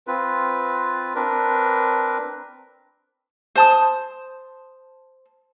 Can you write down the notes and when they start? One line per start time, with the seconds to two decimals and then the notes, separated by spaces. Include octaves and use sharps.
0.07 C4 F4 B4
1.15 C4 D4 A#4 B4
3.55 C5 A5 D#6